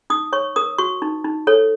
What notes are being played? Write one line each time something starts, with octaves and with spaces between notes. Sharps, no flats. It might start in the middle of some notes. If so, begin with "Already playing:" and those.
D#4 D#6
C#5 C#6
A#4 D#6
F#4 C#6
D#4
D#4
A4 C#5